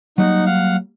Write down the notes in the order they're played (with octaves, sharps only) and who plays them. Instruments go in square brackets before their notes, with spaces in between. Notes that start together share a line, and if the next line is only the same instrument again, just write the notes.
[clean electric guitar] F#3 G3 A#3 [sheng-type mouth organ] D#4 F#5
[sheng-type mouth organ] F5 F#5